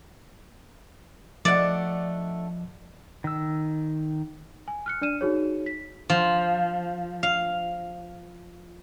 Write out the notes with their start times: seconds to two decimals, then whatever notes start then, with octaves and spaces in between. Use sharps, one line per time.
1.45 F3 A3 D4 D5 D#5 F#5
3.24 D#3 E6
4.68 G#5
4.86 F6 F#6 C#7
5.02 D4 D5 F6 D#7 E7
5.21 D#4 F#4 G#4 C#5
5.66 B6
6.10 F3
7.23 F5